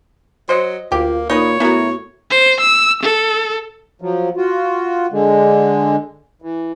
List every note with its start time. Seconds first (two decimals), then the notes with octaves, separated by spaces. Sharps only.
0.49 F#3 C5 D#5
0.92 D2 A#3 F4 G4
1.30 A#2 D#4 B4 C#5 D#6
1.60 A2 B3 E4 F#4 A#4
2.31 C5
2.60 E6
3.03 A4
4.02 F3 F#3
4.37 F4 F#4
5.12 D3 G#3
6.42 E3